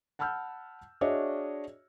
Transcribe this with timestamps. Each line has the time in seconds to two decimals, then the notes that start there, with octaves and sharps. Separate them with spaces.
0.19 F#5 A5 B5 E6 F6 G6
1.01 D4 F#4 G#4 C#5 D#5 E5